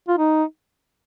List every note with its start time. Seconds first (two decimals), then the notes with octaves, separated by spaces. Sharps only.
0.08 F4
0.18 D#4